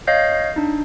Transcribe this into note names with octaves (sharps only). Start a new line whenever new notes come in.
C#5 D#5 F5 G6 C7
D4 D#4